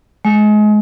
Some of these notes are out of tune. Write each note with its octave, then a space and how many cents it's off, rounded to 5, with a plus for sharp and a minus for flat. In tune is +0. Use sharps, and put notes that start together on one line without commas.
G#3 +30